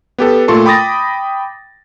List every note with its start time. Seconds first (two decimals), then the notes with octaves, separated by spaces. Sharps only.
0.18 B3 G4 A4
0.48 A#2 A3 F4 A4 C6 C#6
0.65 G5 B5 D6 D#6 A6 A#6